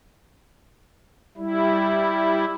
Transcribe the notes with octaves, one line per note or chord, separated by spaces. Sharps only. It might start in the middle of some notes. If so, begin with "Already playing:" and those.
G3 E4